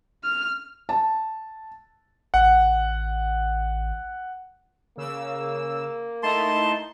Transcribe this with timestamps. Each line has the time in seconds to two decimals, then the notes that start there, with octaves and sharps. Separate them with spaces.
0.24 F6
0.89 A5
2.34 A1 F#5
4.97 C#3 A#3 E6
6.23 A3 D#4 E4 A5 C6